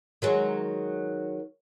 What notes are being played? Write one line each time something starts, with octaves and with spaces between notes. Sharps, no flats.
D#3 F#3 G#3